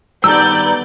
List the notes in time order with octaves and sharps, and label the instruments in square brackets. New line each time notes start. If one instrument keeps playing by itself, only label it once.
[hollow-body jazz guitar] G2 D#3 A4 [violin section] B3 D5 G6 [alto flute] A#5 [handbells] E6